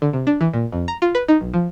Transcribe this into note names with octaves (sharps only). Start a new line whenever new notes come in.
D3
C3
D4
E3
A#2
F2
A#5
F4
B4
D#4
B1
F3